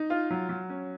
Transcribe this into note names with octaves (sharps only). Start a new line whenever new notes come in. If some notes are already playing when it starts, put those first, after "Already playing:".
Already playing: D#4
F4
F#3
F#3
C#4